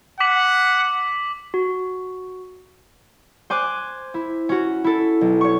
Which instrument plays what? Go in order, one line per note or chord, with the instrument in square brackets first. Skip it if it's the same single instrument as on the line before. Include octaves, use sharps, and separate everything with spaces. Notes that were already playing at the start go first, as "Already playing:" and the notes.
[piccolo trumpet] F#5 [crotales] D6 B6 F#7
[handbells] F#4
[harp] C5 G#5 D6 F#6
E4
C#4 F#4
E4 A4
B1
C#5 C#6